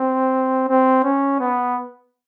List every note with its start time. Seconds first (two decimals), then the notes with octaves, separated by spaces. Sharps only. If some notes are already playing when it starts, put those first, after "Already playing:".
Already playing: C4
0.69 C4
1.04 C#4
1.40 B3